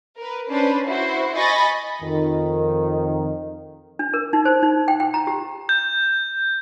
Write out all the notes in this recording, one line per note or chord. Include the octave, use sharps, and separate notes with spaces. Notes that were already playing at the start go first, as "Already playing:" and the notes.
A#4 B4
C#4 D4 B4 C5
E4 F#4 C5
D#5 G#5 B5 C#6 A6 A#6
F2 D#3
D4
A#4
D#4
C5
D#4
G5
G5
A#5
G4
G6